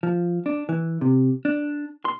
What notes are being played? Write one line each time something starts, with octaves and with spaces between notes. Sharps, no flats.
F3
D4
E3
C3
D4
C6